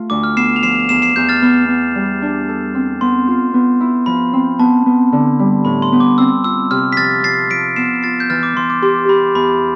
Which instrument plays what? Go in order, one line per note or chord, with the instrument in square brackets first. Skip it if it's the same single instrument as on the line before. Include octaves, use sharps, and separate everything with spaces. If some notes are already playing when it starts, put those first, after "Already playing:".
Already playing: [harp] A3 F4
[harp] D2 [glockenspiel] D6
[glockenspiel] F6
[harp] B3 [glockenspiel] C7 E7
[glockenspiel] F7
[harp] F3 [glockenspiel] C7 E7
[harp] E2 [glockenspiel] C7 E7
[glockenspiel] C7 E7
[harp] E2 [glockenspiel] G6
[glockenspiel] F6 A6
[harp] B3 [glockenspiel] F6
[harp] B3
G3
D4
A4
C4
[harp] B3 [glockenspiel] C6
[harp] F4
B3
E4
[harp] F3 [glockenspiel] B5
[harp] C4
[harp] B3 [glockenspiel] A5
[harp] B3
D3
G3
[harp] A2 [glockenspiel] B5
[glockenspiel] C6
[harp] B3
[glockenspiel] D6
[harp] C4 [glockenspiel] E6
[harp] F4 [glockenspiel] E6
[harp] C3 [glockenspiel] F6
[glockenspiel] B6
[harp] F3 [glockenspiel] F6 A6
[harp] F3 [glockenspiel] A6 C7
[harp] F3 [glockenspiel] B6 D7
[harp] B3 [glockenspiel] C7 E7
[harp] F4 [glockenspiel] A6 C7
[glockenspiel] G6
[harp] E3 [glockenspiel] F6 A6
[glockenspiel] D6
[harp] E3 [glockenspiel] C6
[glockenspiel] D6
[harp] G4 [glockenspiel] C6
[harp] G4 [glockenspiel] B5
[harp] E2 [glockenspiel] B5